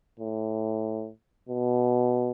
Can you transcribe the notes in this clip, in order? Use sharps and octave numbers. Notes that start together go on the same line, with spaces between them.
A2
B2